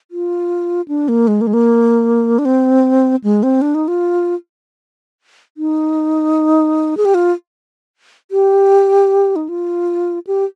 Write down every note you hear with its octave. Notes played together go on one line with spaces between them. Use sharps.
F4
D4
A#3
G#3
A#3
G#3
A#3
D4
C4
G#3
C4
D4
D#4
F4
D#4
G#4
G4
F4
G4
D#4
F4
G4